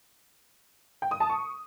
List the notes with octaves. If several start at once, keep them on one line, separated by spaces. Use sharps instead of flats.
G5
D#6
A5
C#6